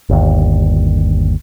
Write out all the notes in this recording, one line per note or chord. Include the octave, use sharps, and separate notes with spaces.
G1 D#2